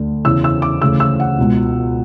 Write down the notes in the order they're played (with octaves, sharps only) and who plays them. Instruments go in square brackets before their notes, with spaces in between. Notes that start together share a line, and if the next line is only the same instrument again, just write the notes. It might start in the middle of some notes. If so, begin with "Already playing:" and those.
Already playing: [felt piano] D2 D3
E2 C#3 E3 E6
E6
D6
D2 C#3 E3 E6
E6
F#5
C#2 B2